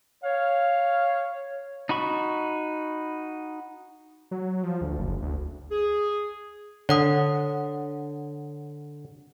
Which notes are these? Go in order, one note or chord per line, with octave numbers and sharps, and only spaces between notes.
C#5 F5
D#4 F#4 B5 C#6
F#3
F3
D2
F#1
D2
G#4
D3 C#5 F#5 D#6